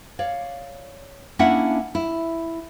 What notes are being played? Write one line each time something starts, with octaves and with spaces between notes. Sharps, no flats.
C#5 D5 F5
A#3 C#4 D4 E4 E5 F#5
E4